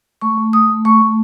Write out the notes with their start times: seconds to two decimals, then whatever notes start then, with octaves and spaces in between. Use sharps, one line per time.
0.21 A3 C#6
0.37 A3
0.53 A3 D#6
0.70 A3
0.85 A3 C#6
1.02 A3